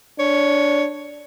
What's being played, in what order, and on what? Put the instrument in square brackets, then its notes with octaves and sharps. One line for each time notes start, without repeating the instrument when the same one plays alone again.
[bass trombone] D4 [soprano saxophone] C#5